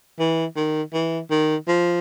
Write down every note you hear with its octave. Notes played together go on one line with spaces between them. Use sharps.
E3
D#3
E3
D#3
F3